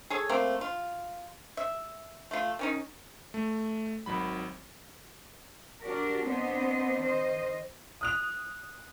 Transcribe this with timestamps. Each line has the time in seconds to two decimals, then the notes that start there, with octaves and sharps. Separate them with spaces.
0.10 G#4 A4 C#5
0.29 A3 A#3 C4
0.61 F4
1.57 E5
2.31 A3 F4
2.59 D#3 C#4 D#4
3.34 A3
4.06 G#1 D#3 F#3 B5
5.82 D4 F#4 G4 A#4
6.27 B3 C4 D4 C5 D#5
7.01 D#3 C5 D#5
8.01 D#6 F#6 F7